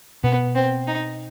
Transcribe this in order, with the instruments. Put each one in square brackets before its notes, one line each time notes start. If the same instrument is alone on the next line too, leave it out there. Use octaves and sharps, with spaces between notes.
[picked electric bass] B2 [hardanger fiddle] B3
[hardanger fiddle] C4
D#4